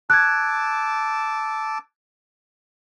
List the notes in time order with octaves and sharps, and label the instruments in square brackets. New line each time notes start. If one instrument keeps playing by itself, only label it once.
[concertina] A5 D6 E6 [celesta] F#6 G#6